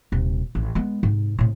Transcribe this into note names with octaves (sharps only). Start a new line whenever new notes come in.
D#1 C3
A1
G#3 B3
G#2 C3
A2 C3